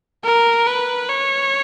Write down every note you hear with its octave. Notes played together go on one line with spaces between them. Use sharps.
A#4
B4
C#5